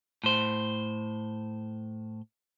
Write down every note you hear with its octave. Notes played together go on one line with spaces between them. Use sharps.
A2 C5